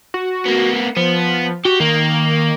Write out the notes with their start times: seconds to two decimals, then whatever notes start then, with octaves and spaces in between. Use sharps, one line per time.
0.14 F#4
0.46 A#3 B3
0.96 F3 B3
1.65 F#4 G4
1.80 D#3 A#3